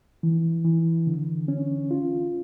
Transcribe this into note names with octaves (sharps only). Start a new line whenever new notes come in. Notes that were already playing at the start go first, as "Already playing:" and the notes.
E3
E3
D3
C#4
F4